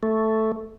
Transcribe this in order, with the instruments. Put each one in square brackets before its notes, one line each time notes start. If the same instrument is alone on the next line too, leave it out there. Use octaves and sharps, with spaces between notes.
[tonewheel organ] A3